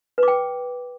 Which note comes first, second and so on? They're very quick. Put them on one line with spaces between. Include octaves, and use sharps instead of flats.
B4 D6 G5